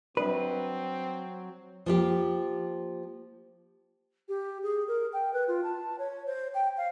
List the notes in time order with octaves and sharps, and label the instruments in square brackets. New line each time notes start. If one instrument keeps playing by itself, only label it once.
[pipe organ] F#3 [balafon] G3 D4 D5 [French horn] C4 [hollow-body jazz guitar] B4
[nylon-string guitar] F3 A#3 G4
[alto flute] G4
G#4
A#4
G5
B4
F4
A5
C#5
C5
G5
F5